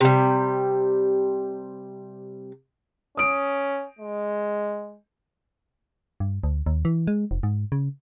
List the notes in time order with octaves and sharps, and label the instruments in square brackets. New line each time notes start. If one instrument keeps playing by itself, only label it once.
[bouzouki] C3 G3
[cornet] C#4 [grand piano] D#6 D7
[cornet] G#3
[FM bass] G2
D2
D#2
E3
G#3
F1
G#2
C#3